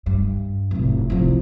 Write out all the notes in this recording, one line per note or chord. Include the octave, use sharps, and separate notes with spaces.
G2
F1 A2
C2 F3